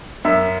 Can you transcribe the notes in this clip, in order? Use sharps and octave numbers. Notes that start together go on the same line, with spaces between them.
F#2 E5